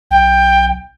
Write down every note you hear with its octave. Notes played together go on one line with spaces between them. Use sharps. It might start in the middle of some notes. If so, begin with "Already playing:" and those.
B1 G5